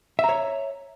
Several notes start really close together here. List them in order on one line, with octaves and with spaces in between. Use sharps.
E5 A#5 C#5